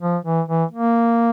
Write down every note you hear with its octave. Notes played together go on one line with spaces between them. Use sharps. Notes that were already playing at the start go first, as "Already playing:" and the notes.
F3
E3
E3
A#3